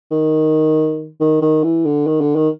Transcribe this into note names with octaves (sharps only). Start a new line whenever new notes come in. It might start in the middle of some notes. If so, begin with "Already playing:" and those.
D#3
D#3
D#3
E3
D3
D#3
D3
D#3